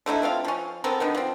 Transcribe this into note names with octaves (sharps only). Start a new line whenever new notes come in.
D3 A3 D#4 E4
A3 C4 F4 F5
F3 C#4
B3 C4 A4 A#4
D3 D#3 B3
F3 C4